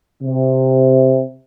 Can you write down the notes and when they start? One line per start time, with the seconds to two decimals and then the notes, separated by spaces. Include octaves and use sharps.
0.22 C3